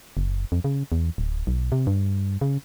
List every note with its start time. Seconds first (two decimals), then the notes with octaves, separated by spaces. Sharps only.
0.17 F#1
0.52 F2
0.64 C#3
0.92 E2
1.18 D1
1.47 B1
1.72 C3
1.87 G2
2.41 C#3